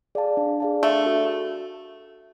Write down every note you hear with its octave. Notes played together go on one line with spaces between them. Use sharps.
G#4 D5 F5 A5
D4
G#4 D5 F5 A5
A3 D4
F#4 A4